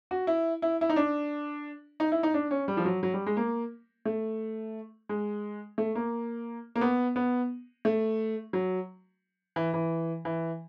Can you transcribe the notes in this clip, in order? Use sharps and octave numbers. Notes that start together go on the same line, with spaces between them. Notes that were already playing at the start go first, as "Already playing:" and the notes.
F#4
E4
E4
E4
D#4
D4
D#4
E4
D#4
D4
C#4
G3
F3
F#3
F#3
G3
G#3
A#3
A3
G#3
A3
A#3
A#3
B3
B3
A3
F#3
E3
E3
E3